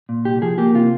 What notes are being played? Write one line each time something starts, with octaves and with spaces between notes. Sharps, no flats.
A#2
C2 G4
F3 G#4
A#3 G4
C3 F4